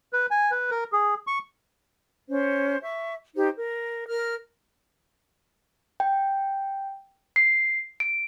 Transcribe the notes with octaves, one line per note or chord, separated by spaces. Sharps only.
B4
G#5
B4
A#4
G#4
C#6
C#4 C5
E5 C#6
D#4 G4 C5
A#4
A#4 F6
G5
C7
D7